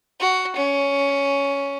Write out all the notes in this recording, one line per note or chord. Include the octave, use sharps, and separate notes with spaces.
F#4
C#4